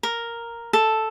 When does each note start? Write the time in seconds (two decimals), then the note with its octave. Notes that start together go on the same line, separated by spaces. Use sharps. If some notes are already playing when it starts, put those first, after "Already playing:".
0.03 A#4
0.73 A4